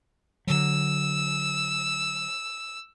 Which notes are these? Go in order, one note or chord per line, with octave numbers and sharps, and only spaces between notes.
D3 F#3 E6